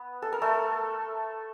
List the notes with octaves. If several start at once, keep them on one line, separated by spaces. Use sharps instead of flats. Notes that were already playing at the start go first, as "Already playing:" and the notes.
Already playing: B3
A4
A#4
A3 A4